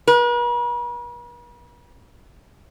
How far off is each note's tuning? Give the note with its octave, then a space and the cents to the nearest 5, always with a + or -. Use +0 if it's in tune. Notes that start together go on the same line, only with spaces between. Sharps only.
B4 -45